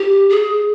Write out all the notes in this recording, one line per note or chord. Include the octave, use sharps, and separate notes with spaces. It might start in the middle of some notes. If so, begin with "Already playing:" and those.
Already playing: G4
G#4